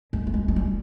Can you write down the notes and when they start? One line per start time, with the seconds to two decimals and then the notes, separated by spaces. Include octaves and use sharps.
0.13 G#3
0.27 A3
0.34 G#3
0.48 G#3
0.56 G3